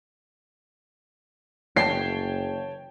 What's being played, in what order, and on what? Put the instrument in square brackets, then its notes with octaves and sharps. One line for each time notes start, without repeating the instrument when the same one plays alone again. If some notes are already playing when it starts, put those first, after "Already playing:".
[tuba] F#1 [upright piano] C#5 G5 A5 [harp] C7